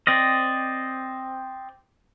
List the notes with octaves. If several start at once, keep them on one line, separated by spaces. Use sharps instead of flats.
C4 D5 D#5